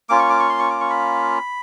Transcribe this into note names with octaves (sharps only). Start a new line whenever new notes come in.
A#3 C#4 F4 D6
C#6
D6
C#6
C6
C#6
D6
C#6
B5